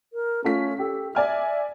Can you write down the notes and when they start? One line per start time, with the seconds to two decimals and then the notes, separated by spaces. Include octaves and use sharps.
0.13 A#4
0.44 A3 C#4 F4 B6
0.78 G4 A4
1.15 D5 E5 G#5 F6